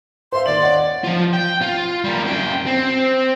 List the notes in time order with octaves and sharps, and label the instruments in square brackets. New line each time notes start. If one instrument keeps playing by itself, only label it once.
[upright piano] C5 E5 F5 [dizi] C6
[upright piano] D#2 F#7 [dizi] D5
[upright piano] C#5 D#5 F#5
[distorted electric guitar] F3 F4
G5
F4
G3 A#3
F#2 G5
C4